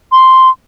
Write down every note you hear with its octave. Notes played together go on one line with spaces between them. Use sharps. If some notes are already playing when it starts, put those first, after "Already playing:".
C6